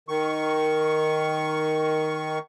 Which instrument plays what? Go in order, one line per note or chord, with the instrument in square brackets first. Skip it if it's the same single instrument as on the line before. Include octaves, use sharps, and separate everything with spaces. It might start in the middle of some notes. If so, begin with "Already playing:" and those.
[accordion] D#3 C#6